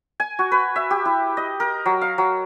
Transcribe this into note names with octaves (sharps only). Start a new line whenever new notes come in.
G#5
F#4
B4
E5
G4
E4
D#5
A#4
F#3
F5
F#3